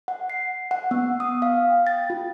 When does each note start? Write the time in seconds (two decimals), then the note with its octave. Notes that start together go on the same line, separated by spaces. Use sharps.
0.08 F#5
0.30 C7
0.71 F#5
0.91 B3
1.20 D#6
1.42 F5
1.70 G5
1.87 A6
2.10 F4